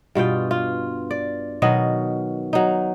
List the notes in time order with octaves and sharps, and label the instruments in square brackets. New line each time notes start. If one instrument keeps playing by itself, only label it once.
[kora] G2 B2 F4 G5
F4
D5
B2 D#3 F#3 D#5
F#3 D#4